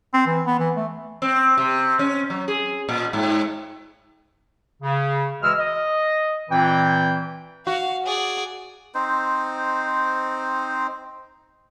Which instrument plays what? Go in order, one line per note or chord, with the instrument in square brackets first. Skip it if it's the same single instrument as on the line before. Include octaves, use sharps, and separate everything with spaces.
[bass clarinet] C4
E3
B3
E3
A3
[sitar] C4
C3
C#4
F#3
G#4
A#2
G#2
[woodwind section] C#3
D2 E3 G#3 E6 F6
D#5
A#2 E3 C4 G5
[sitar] F#4 [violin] F5
[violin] G#4 D5
[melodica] C4 D#4 C5